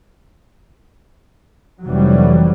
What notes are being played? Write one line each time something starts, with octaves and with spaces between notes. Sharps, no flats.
F1 E3 F#3 G3